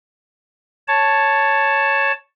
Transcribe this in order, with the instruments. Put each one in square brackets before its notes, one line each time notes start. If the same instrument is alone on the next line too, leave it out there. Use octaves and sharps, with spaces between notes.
[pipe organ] C#5 A5